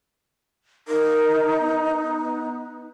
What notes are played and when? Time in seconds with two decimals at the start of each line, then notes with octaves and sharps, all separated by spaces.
0.88 D#4 A#4
1.59 B3